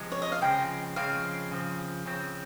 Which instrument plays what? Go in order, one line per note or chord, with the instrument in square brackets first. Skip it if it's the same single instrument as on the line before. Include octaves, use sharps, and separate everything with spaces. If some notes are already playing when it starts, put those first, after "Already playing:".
Already playing: [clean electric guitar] C3 F3 G#3
[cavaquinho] C#5
D#5
F5
[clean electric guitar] C#3 F3 G#3 C4 [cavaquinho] G5
[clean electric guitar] C#3 F3 G#3 C4 [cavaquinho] F5
[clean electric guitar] C#3 F3 C4
C#3 F3 C4